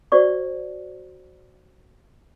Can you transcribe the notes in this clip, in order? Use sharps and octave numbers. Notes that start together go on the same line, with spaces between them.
F#4 C5 D5 C#6